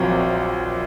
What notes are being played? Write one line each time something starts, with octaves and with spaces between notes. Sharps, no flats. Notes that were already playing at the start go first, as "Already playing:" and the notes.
Already playing: A#1 A#2 F#3 C4 F4